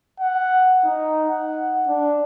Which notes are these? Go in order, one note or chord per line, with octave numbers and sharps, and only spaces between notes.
F#5
D#4
F#5
D4